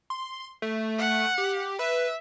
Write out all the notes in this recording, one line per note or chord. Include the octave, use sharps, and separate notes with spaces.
C6
A3
F#5
G4
B4 E5